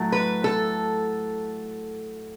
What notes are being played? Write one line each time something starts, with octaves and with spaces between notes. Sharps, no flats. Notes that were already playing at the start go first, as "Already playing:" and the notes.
Already playing: A2 F#3 A3
B4
A4